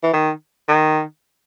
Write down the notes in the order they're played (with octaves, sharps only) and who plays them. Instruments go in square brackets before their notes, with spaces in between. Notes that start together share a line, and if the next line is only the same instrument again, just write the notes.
[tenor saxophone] E3
D#3
D#3